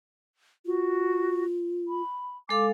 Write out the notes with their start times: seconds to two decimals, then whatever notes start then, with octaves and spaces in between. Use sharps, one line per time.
0.65 F4 F#4
1.88 B5
2.49 G#3 A4 F5 D6